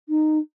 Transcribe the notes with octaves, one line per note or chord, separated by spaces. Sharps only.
D#4